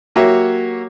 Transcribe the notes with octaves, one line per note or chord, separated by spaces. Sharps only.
F#3 A#3 F#4 G4 C#5 E5